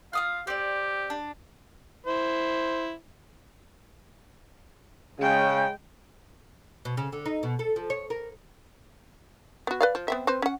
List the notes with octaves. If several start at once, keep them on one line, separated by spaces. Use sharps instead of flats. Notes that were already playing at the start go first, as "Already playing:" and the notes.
F4 F5 D#6 F6
C4 G4 D5
D4
E4 C5
C#3 G#3 G5
B2
C#3
D3
D#4
B2
A4
F3
C#5
A#4
B3 F#4
B4 D5 F5
F3
B3 C4 E5
C4 B4 C5
C#4 F#5